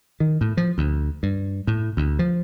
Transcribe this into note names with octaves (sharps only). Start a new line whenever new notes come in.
D#3
A2
F3
D2
G2
A2
D2
F3